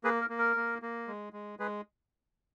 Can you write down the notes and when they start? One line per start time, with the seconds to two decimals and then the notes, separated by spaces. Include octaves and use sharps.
0.04 A#3 G#4 B4
0.21 A#4
0.29 A#3
0.38 A#4
0.56 A#3
0.82 A#3
1.07 G#3
1.33 G#3
1.59 G#3 G#4 B4